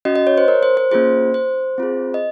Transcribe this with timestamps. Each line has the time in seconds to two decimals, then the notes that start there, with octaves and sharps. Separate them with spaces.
0.05 C#4 F#4 D#5
0.16 D#5
0.27 C#5
0.38 C5
0.48 A#4
0.63 C5
0.77 C5
0.91 A#3 C#4 F4 G#4 C5
1.34 C5
1.78 C4 F4 G#4
2.14 D#5